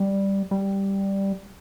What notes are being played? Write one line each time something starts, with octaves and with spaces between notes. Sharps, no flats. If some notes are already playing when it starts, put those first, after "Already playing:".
Already playing: G3
G3